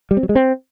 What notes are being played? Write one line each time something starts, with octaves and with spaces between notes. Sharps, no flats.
G3
C4
F#3
G#3
C4